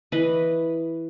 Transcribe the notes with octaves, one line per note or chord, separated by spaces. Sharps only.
E3 B4 D#5